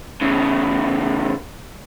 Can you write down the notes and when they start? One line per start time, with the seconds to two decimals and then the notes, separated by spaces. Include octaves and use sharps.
0.21 E2 C#3